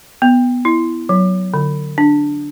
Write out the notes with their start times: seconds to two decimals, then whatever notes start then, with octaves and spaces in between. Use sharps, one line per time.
0.22 B3
0.65 E4
1.09 F#3
1.54 D3
1.98 D4